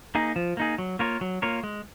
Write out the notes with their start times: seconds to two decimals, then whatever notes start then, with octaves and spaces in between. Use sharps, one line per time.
0.15 A#3 D#4 G#4
0.36 F3
0.57 A#3 D#4 G#4
0.78 F#3
0.99 A#3 F4 A#4 C#5
1.21 F#3
1.42 A#3 F4 A#4 C#5
1.64 G#3